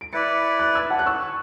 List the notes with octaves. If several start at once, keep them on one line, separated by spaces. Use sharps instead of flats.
D7
E4 B4 D5 A6 C#7
F#6 A6
E6 G#6
F#5 A5
F#6
C#6 E6